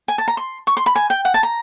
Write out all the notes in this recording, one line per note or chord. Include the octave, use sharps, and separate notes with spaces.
G#5
A5
A#5
C6
C#6
C6
B5
G#5
G5
F#5
A5
A#5